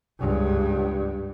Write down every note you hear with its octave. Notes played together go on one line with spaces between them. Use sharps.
C#2 G2